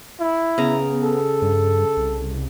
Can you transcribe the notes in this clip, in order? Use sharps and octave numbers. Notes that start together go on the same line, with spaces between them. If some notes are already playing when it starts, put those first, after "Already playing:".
E4
C#3 B3 A#5
A4
G2
C2